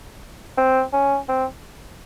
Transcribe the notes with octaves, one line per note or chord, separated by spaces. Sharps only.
C4
C#4
C4